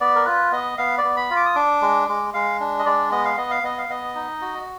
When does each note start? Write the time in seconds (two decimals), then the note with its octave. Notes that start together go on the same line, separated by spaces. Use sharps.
0.01 B3 D5
0.16 A#4
0.26 F4 B4
0.52 B3 D#5
0.78 B3 F5
0.98 D5
1.04 B3
1.17 B5
1.30 F4
1.37 D6
1.46 D#6
1.55 D4 D6
1.82 G#3
2.08 G#3
2.34 G#3 F5
2.60 D4
2.79 D#5
2.86 G#3 D5
3.12 B3 D#5
3.25 F5
3.38 B3 D#5
3.51 F5
3.63 B3 D#5
3.78 F5
3.89 B3 D#5
4.15 D#4
4.41 F#4